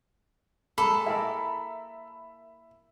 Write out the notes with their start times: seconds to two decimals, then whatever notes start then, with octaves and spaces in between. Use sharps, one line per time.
0.78 G#3 A#3 A4 B5
1.06 E4 A#4 D5 E5